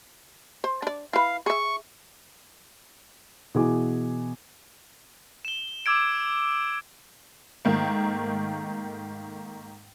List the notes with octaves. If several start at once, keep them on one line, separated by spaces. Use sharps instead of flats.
C5
D4 D5
E4 B4 F5
G#4 E5 C#6
B2 E3 E4 G#4 G#5 D6
E7 G7
D6 E6 G#6 D7
G#2 D#3 A3 A#3